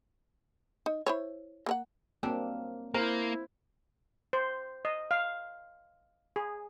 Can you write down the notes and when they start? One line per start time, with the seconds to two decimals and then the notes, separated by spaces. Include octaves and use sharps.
0.86 D#4
1.06 E4 C5 C#5
1.66 A#3 A#4 F#5
2.23 F#3 G3 A#3 C4 D4
2.94 A#3 E4 A#4 C5
4.33 C5
4.85 D#5
5.11 F5
6.36 G#4